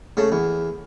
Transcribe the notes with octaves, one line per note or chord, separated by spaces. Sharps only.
C#3 A3
E2